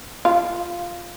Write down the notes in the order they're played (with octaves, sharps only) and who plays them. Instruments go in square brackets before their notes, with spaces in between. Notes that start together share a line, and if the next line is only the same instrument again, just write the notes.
[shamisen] F4